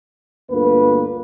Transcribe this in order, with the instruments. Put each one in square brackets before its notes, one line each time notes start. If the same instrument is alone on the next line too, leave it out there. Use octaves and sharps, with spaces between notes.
[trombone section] D2 G2 A#3 B3 F4 B4